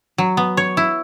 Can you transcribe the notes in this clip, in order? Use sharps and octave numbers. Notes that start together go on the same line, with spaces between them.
F#3
B3
C#5
E4